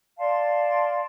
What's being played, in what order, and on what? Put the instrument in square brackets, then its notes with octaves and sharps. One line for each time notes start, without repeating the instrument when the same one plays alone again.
[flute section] D5 F5 A5 C6